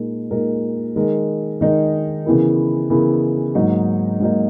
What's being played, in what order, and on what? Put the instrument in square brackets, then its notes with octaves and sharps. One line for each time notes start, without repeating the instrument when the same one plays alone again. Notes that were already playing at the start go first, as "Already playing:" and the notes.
Already playing: [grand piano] A#2 G#3 D#4 A#4
A#2 G#3 D#4 A#4
D#3 G#3 D#4 A#4
D#3 G#3 D#4 A#4
C#3 E3 B3 E4 A#4
C#3 E3 B3 E4 A#4
G#2 F#3 A#3 D#4
G#2 F#3 A#3 D#4